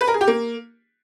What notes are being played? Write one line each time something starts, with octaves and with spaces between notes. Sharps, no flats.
B4
A#4
G#4
G4
A#3